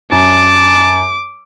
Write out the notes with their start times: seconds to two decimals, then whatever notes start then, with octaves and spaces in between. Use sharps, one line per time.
0.12 F#2 A5 D6